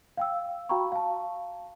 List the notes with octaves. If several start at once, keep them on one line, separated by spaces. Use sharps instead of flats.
F5 G5 E6
F#4 F5 G5 A#5 B5 C#6
F5 A5